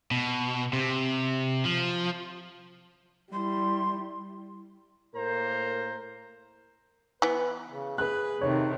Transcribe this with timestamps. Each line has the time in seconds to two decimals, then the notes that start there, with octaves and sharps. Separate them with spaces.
0.11 B2
0.73 C3
1.65 F3
3.33 G3 E4 C6
5.15 A2 A#3 A#4 C5 A#5
7.22 E3 B3 B4
7.69 C#3
7.98 G#4 B4 F#6
8.41 C3 D#3 A3 C#5